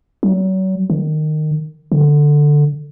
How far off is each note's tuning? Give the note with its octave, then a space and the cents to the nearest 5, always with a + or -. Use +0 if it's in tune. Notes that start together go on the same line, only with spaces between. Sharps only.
F#3 +35
D#3 -20
D3 +5